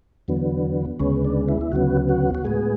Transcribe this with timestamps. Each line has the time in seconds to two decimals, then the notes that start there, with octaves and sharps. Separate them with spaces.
0.28 E2 D3 F#3 B3
1.00 D2 C#3 G#3 B3 C#4
1.25 D4
1.48 E4
1.61 E4
1.72 D2 C#3 F#3 B3 F#4
2.09 F#4
2.35 F#4
2.45 A2 G#3 B3 G#4